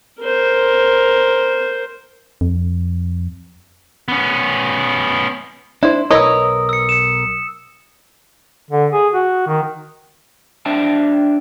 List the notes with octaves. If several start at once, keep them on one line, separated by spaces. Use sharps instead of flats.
A#4 C5
F2
B3 C#4
D4 E4 C5
B1 A#4 B4 C#5 D#5 D#6 E6
E6 C#7
C#7 E7
D3
G#4
F#4
D#3
D4 C5 D5 E5 G5 A5